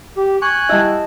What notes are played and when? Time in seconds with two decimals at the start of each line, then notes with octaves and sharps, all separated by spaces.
0.17 G4
0.42 G#5 C#6 F#6 G6
0.69 G3 E4 D#5 A5